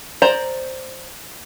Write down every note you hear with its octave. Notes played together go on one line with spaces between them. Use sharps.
C5 D5 A#5